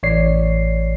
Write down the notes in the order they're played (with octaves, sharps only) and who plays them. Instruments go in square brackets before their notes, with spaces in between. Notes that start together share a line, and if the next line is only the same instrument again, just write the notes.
[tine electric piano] A1 C#5 D5 C7